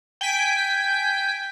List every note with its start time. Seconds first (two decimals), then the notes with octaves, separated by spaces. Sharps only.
0.21 G5 G#5 B6 D7